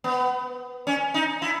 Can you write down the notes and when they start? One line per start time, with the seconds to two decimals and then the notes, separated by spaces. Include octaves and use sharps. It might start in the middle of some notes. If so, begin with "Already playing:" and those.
0.04 B3
0.87 C#4
1.14 D#4
1.42 E4